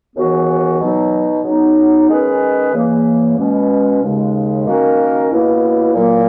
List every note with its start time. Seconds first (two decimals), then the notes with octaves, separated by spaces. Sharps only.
0.16 D#2 C#3 E3 B3 F#4
0.80 B2 F#3 B3 D#4
1.44 C#3 F#3 B3 D#4
2.10 D#3 G#3 C#4 G#4 B4
2.73 E2 C#3 E3 A#3
3.37 B2 G#3 C#4
4.02 D#2 C#3 G#3
4.67 D#3 A#3 C#4 F#4 A#4
5.31 C#2 B2 A#3 E4
5.95 A#2 F#3 A#3